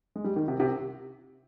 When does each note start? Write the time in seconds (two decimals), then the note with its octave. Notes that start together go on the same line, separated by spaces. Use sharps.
0.16 G#3
0.24 G3
0.36 D#3
0.48 C3
0.60 C3